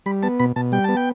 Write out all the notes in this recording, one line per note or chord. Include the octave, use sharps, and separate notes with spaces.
G3 B5
B3 A5
B2 B5
B2 A5
G3 G5
B3 A5
G5